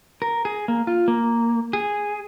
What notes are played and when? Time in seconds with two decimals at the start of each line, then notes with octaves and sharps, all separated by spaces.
0.22 A#4
0.45 G#4
0.68 A#3
0.87 F4
1.08 A#3
1.73 G#4